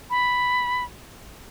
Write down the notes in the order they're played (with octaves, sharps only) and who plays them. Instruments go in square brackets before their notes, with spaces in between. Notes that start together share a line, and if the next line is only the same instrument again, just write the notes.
[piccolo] B5